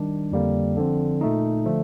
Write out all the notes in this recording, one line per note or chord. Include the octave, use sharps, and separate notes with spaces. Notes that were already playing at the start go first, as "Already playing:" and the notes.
Already playing: D#3 G3 D4
F2 D3 G3 A#3
D3 F3 C4
A#2 A3 D#4
D3 F3 A3